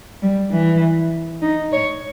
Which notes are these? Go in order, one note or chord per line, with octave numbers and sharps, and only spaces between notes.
G3
E3
D#4
C#5